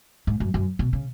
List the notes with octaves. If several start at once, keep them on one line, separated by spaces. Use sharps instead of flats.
G#2
F#2
F#2
B2
C#3